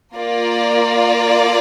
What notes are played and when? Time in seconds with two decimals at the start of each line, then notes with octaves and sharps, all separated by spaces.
0.16 A#3 F4 A#4 D5